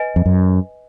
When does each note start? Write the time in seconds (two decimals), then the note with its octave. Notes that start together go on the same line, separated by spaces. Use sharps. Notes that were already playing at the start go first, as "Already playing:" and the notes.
Already playing: B4 D#5 G#5
0.16 F2
0.26 F#2